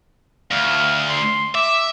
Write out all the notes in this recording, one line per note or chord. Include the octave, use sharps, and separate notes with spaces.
D2 F5
C6
E5 D6